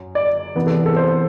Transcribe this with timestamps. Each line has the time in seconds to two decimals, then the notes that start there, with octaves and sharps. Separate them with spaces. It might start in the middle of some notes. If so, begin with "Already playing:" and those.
Already playing: F#2 F#3
0.15 D5
0.55 C3 E3 B3 B4
0.67 A4
0.86 A4
0.96 C5